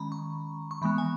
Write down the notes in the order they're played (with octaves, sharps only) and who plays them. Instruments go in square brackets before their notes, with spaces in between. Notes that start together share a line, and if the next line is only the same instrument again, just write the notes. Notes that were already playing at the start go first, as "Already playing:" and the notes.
Already playing: [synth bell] D#3 G#3 C#4 A#5 B5
C#6
C#6
E3 G#3 B3 B5
G#5